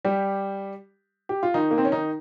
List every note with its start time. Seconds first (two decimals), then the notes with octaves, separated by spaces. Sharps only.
0.05 G3 G4
1.29 G4
1.43 F4
1.54 D#3 D#4
1.71 A#3
1.78 C4
1.85 C#4
1.92 D#3 D#4